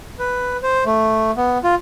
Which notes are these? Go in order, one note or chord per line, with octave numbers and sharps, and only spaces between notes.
B4
C5
A3
B3
F4